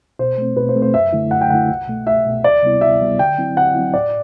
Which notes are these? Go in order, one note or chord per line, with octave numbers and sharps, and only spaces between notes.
B2 C5
A3 C4
B2 B4
C5
A3 C4
C5
F#2 E5
D3 A3 E4
F#2 F#5
G5
D3 A3 E4 F#5
C2
B2 A3
C2 E5
B2 A3
D2 D5
C3 G3 B3 E4
D2 E5
C3 G3 B3 E4
D3 G5
F#3 C4 E4
D3 F#5
F#3 C4 E4
A2 D5